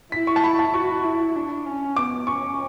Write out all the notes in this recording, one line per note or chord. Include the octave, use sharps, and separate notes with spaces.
E4 B6
C#6
A5
B5
A5
F#4 C#6
E4
D4
C#4
B3 D6
C#4 C#6